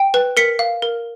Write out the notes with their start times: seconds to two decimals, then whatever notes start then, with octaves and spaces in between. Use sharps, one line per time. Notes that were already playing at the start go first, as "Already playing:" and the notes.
Already playing: G5
0.14 B4
0.37 A#4 B6 C#7
0.59 F5
0.82 A#4